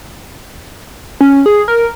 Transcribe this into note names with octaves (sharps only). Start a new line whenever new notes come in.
C#4
G#4
A#4